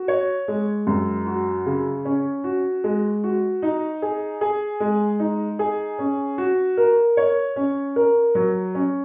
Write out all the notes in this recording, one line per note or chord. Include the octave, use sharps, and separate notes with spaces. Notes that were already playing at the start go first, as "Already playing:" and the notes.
Already playing: F#4
C#5
G#3
F#2
F#4
C#3
C#4
F#4
G#3
F#4
D#4
G#4
G#4
G#3
D#4
G#4
C#4
F#4
A#4
C#5
C#4
A#4
F#3
C#4